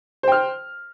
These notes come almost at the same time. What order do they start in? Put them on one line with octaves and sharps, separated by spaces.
C5 G5 F6